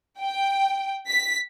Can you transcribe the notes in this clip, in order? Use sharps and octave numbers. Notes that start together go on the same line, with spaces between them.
G5
B6